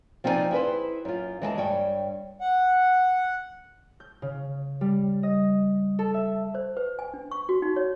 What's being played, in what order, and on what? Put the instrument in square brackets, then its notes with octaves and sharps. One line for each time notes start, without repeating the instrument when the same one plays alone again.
[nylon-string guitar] F3 C4 D#4 E4 D5 G#5
E4 G#4 B4 C5
F#2 F4
E3 G#3 G5 A5
G2 C#5 G5
[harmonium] F#5
[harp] G6
C#3
G3
D#5
A4
E5
[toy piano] C5
B4
G#5
D4
C#6
F#4
D#4
C#5